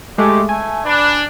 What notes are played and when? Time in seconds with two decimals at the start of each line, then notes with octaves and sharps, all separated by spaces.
0.18 G#3 A3 G4
0.49 A3 G#5
0.86 D4 B4